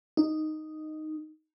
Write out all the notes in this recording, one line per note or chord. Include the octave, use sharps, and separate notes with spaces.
D#4